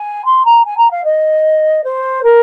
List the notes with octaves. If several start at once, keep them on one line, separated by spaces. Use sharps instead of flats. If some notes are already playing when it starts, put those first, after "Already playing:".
Already playing: G#5
C6
A#5
G#5
A#5
F5
D#5
C5
A#4